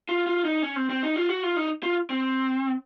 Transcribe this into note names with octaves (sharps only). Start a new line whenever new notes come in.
F4
F4
D#4
C#4
C4
C4
D#4
F4
F#4
F4
D#4
F4
C4